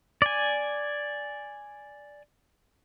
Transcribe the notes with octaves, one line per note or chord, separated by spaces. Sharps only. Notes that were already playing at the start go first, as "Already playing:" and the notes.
D5 G#5